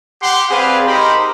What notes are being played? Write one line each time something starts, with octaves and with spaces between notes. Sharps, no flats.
G4 F#5 C6
G3 C4 G#4 B4 F5
D#4 G4 A#4 C5 B5